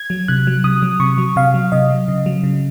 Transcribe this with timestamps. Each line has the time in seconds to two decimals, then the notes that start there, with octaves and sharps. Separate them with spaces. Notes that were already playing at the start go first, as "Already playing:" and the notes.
Already playing: G#6
0.10 F#3
0.28 C3 F#6
0.47 F#3
0.64 C3 D#6
0.83 F#3
1.00 C3 C#6
1.18 F#3
1.36 C3 F5
1.54 F#3
1.72 C3 D#5
1.91 F#3
2.08 C#3
2.26 F#3
2.44 C#3